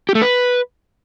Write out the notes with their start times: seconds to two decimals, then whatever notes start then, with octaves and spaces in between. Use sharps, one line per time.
0.09 G4
0.15 A3
0.22 B4